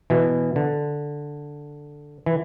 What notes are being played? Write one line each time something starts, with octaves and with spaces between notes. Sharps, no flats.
B2 E3
D3
E3